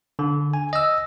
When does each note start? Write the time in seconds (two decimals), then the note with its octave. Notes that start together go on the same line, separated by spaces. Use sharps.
0.19 D3
0.54 G#5
0.73 D#5 E6